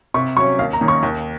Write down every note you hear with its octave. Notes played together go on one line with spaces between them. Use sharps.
C3 C#6
F#3 C#4 C#6
D#2 F5
A#5
D#3 A#3 C#4
C#6
D#2